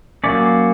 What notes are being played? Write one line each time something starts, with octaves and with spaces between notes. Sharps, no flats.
F#3 A#3 C#4 D5